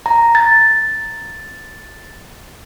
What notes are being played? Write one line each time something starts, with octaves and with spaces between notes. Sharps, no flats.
A#5
A6